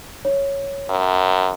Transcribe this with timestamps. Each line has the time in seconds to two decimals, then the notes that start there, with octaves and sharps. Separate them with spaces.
0.25 C#5
0.90 F#2